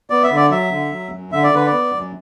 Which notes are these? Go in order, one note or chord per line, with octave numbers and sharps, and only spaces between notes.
B3 D5
E5
D3
D5
F#3 E5
D3
F#3
F#2
D3 E5
D5
D3 B4
D5
B3
F#2